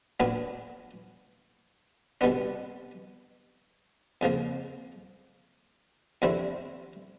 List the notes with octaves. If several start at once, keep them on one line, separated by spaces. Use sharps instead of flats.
A#2 F#3 B3 D4
C2 B2 G3 B3 D4
F2 C#3 F3 A#3
F2 D3 G3 C4 E4